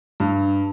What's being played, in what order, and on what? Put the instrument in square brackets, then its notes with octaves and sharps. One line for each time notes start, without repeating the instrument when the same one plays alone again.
[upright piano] G2